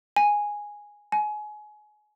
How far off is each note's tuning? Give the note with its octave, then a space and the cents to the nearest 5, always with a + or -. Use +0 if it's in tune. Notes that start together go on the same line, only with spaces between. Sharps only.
G#5 -5
G#5 +25